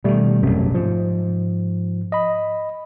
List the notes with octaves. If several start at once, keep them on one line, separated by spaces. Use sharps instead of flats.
B2 D#3 G3 A3
E1 A1 F#2 C3
G#2 F3
D#5 B5